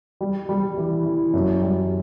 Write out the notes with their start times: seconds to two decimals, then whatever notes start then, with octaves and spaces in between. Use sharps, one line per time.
0.21 G3
0.49 G3
0.77 E3
1.05 E3
1.33 F#2
1.62 G3